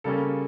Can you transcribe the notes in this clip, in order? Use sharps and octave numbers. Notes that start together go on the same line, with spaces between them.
C#3 G3 A#3 C#4 A4